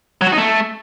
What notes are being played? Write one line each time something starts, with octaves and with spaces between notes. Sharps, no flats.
F#3
F#4
D#4
A3